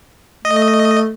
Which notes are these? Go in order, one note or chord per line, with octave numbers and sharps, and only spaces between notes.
A3 D#5